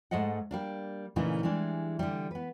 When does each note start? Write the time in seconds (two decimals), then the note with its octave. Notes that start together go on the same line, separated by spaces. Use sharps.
0.11 G#2 G#3 A3 D#5 F#5
0.51 G3 A#3 D4
1.16 A#2 C#3 E3 A3 D#4
1.43 E3 G3 G#3 D4
1.99 D3 G3
2.31 B3 B4